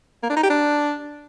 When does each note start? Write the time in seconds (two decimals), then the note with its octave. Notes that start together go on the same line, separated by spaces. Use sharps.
0.23 A#3
0.30 D4
0.37 D#4
0.43 G4
0.50 D4